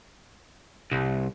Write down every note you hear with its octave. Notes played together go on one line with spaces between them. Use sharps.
C2